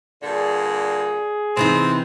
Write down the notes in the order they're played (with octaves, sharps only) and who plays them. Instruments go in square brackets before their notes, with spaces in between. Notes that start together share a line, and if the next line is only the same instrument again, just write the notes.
[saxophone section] G2 A#2 D3 [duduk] G#4
[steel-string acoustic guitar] C3 E3 D#4 [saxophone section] B3 C4